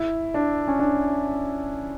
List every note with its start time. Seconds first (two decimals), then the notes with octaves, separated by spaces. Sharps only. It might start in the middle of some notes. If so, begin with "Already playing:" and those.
Already playing: E4
0.34 D4
0.68 C#4
0.79 D4